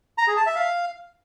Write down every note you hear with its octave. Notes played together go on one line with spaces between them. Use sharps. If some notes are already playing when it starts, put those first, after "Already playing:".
A#5
G#4
A5
E5
F5